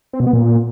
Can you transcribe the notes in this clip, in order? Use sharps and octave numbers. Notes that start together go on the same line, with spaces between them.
C4
B2
B3
A#2